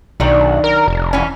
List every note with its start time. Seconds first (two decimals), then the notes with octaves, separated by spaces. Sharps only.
0.20 B1 D#3 F#3 D4
0.64 A#4
0.88 F1
1.13 E3 C#4